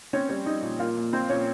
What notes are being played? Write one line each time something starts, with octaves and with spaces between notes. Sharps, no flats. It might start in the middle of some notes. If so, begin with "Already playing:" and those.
C4 C#4 C#5
G3 C#4 C#5
G3 D#4 D#5
A#2
A#3 F4 F5
A#2
A#2 C4 C5
A#2 C#4 C#5